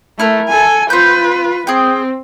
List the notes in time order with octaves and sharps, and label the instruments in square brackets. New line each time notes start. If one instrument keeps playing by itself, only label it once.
[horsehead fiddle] A3 [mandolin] E4 A#4
[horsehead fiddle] A4 G#5
[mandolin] C4 G6 [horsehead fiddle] F4 B4
[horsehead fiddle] C4 [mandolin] G#4 G5